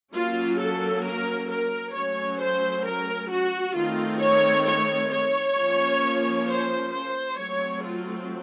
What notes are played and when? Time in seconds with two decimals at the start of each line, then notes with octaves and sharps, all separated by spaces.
0.13 F#3 A#3 C#4 F4
0.59 A4
1.04 A#4
1.50 A#4
1.94 F#3 A3 C#4 C#5
2.40 C5
2.85 A#4
3.30 F#4
3.75 D#3 A3 C4 F4
4.20 C#5
4.66 C#5
5.11 C#5
5.57 F3 A#3 C#4
6.47 C5
6.93 C5
7.38 F#3 A3 C4 C#5
7.83 F4